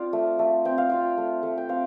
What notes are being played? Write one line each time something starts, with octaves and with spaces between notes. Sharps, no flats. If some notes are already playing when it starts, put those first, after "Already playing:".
Already playing: C4 F4 D5 F5
A3
A3
C4 G5
F5
F4 G5
A3
A3
G5
C4 F5